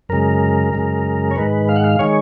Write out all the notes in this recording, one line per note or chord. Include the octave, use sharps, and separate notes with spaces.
F#2 C#3 G#3 A#4
F#2 C#3 G#3
C#5
G#2 D#3 G#3 B4
F5
F#5
F5
D#3 G#3 C#5